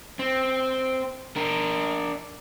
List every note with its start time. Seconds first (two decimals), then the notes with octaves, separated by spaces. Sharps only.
0.19 C4
1.36 D4 A#4